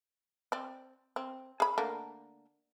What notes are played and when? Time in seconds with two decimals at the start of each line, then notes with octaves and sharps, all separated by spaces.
0.52 C4 D5
1.16 C4
1.60 G#4 B5
1.78 D3 A3 A#3